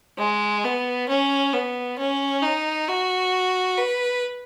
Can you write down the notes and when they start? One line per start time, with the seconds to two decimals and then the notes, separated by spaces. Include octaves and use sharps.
0.18 G#3
0.64 B3
1.09 C#4
1.53 B3
1.98 C#4
2.42 D#4
2.87 F#4
3.77 B4